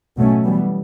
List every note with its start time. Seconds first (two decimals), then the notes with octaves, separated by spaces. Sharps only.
0.16 B2 F#3 A3 C#4
0.45 E3 G3 B3